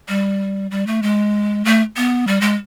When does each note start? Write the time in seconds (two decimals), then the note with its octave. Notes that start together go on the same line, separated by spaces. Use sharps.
0.09 G3
0.71 G3
0.87 A3
1.02 G#3
1.65 A3
1.97 B3
2.27 G3
2.41 G#3